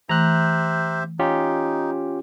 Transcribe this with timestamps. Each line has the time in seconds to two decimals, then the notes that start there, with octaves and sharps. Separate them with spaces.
0.09 E3 A3 G4 C5 E5 A#5 F#6
1.19 C#4 D#4 F4 G4